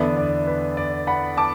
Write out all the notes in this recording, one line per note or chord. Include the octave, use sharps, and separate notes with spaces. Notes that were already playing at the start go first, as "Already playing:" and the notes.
Already playing: E2 D3 B3 D4 B4 E5
D5
B4
D5
F#5 B5
A5 D6